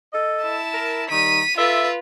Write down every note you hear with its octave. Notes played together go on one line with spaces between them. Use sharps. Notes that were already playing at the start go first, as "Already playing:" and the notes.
A4 D#5
E4 A5
A#4
D#3 G3 D#4 B6 D#7
F4 A4 B4 E5